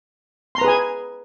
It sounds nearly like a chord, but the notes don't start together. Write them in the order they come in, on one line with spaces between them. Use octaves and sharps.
C6 A#5 B4 G#4 G#5